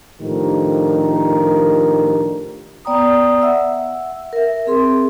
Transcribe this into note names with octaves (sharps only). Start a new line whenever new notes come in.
A2 D#3 F3 D4 G4 A#4
B3 D5 G5 A#5 D#6
E5 F#5 E6
A#4 E5
C4 G#4 C6